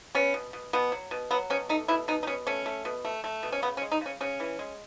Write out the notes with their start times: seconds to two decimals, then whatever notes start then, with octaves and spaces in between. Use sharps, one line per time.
0.15 B3 C#4
0.34 B2
0.53 B2
0.73 B2 B3
0.92 F#3
1.11 B2
1.31 F#3 B3
1.50 B2 C#4
1.69 A3 D#4
1.88 B2 E4
2.08 B2 D#4
2.23 D#4
2.27 B2 C#4
2.47 A3 C#4
2.66 A3
2.85 B2
3.05 A3
3.24 A3
3.43 B2
3.52 C#4
3.62 C#3 B3
3.77 C#4
3.82 G#3
3.92 D#4
4.01 C#3 C#4
4.21 C#3 C#4
4.40 E3
4.59 G#3